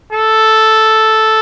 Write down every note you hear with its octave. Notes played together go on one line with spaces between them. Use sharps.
A4